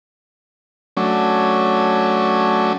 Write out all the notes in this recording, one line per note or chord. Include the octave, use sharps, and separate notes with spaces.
F#3 A3 C#4 D4